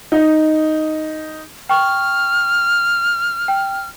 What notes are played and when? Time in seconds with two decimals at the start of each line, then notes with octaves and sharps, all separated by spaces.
0.12 D#4
1.69 G5 C#6 F6
3.48 G5